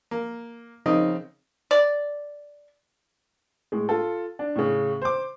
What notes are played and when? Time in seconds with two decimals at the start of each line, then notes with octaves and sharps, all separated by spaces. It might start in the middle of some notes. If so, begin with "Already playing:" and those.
0.11 A#3
0.86 C#3 F3 C4 D#4 A#4 D#5
1.71 D5
3.72 A2 G#3
3.89 F4 A4
4.39 D4
4.56 A2 C#3
5.02 C5 D6